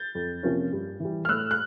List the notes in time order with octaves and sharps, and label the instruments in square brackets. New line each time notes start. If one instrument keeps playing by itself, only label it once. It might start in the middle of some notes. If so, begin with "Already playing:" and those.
Already playing: [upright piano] G6 A6
F2
C3 F3 A#3 C#4
G2
E3 G3
F6
A2 E6 F#6
F#6